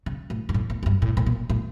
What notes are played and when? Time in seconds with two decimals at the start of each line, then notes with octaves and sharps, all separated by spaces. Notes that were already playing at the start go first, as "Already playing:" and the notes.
0.06 C#3
0.30 A2
0.49 G2
0.54 A2
0.70 A2
0.83 A2
0.86 G2
1.02 A2
1.17 A2
1.26 A#2
1.50 A2